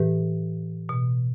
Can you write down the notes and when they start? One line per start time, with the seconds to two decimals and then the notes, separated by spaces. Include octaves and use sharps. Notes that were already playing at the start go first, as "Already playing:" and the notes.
Already playing: A2 E3 G4 B4
0.89 B2